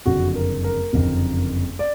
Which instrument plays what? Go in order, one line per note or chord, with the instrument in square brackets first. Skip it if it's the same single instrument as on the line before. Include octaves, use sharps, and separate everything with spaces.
[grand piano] F#1 F2 D3 F#4
A#4
A#4
F#1 F2 D3
D5